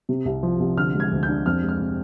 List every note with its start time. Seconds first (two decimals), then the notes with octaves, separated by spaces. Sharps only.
0.09 C3
0.26 C2
0.43 F3
0.60 C2
0.77 D3 F6
0.94 G#3
1.00 G#6
1.11 D2
1.23 G6
1.28 D4
1.46 F2 F6
1.63 G#3
1.69 F6
1.80 C3